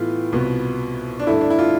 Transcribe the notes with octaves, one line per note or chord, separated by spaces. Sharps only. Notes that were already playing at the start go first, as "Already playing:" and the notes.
Already playing: A2 E3 B3 F4
C2 B2 B3
D4
G2 D3 A3 E4
D4
E4
F4